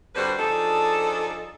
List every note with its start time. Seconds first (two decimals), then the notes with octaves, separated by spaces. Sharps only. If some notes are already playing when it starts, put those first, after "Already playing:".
0.15 G2 D3 G3 F#4 B4 C5
0.38 F3 D4 D#4 G#4 A4